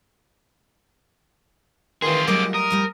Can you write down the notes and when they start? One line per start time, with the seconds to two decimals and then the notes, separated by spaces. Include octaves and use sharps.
2.02 D#3 E3 F4 G#4 C6
2.28 F#3 G3 A3 A#3 D#5 D6
2.54 A#4 D#6
2.70 F2 G3 A3